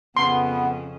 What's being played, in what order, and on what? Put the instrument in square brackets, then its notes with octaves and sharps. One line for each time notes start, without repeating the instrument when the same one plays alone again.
[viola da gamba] F2 C#3 [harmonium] B3 [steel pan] C6